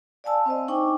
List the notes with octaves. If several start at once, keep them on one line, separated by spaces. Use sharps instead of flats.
D5 F5 G#5 A5 E6
C4 C5 D#5
D4 D#4 G5 G#5 C#6 D6